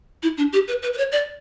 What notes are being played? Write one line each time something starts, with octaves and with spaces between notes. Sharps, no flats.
E4
D4
G4
B4
B4
B4
C#5
D5